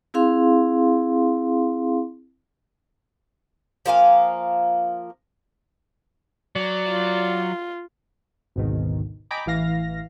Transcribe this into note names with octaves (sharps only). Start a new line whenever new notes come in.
C4 E4 G#4 F5 C6
F3 A#3 F5 G#5
F#3 D5
F4
G#1 D2 G#2 B2 D#3
D#5 G5 G#5 A#5 B5 D6
A1 E3 F5 A#6